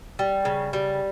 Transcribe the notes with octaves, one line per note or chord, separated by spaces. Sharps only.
G3
C#3
G3